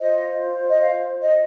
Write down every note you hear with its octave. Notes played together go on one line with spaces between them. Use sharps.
F4 C5 D#5
D#5
F5
D#5